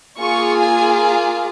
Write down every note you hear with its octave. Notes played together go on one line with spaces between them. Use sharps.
A#3 F4 G#4 C#6
G#5
G#5